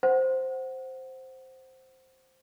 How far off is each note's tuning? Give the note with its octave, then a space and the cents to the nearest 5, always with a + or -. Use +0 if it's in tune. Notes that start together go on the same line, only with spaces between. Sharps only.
C5 +0 F#5 +10